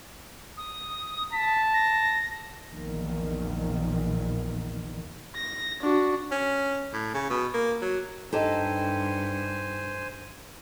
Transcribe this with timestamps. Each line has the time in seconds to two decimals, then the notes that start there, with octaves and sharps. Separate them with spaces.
0.57 D#6
1.33 A5 B6
1.74 A#6
2.70 A#1 E2 A#2 D#3
5.36 A#6
5.81 D4 F#4
6.32 C#4
6.93 A2
7.14 C#3
7.30 B2
7.54 A#3
7.82 F#3
8.33 G2 D#4 G4 A4 C5 G#5